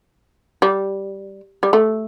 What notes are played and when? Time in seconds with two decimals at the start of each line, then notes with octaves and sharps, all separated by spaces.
0.62 G3
1.63 G3
1.73 A3